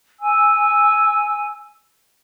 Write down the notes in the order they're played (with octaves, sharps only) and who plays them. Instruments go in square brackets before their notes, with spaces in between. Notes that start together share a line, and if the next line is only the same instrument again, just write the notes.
[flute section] G#5 E6